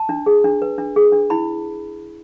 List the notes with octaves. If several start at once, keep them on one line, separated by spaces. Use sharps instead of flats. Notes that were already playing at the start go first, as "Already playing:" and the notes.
Already playing: A5
D4
G#4
D4
B4
D4
G#4
D4
E4 B5